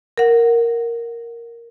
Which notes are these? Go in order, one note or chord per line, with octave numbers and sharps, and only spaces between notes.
A#4 F#5